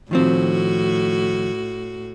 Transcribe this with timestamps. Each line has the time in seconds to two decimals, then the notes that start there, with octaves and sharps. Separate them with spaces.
0.11 A2 D#3 F3 C4 F#4